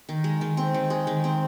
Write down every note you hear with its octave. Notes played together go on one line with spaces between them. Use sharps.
D#3
G#3
D#3
C4
D#3
G#3
D#3
C4